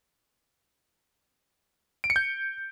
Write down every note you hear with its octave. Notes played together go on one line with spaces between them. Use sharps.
D7
C#7
G6